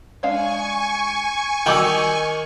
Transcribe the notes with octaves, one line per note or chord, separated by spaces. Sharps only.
G#3 D4 F5 G#5 C#6
D#3 G3 D#4 F#4 G5 D6 E6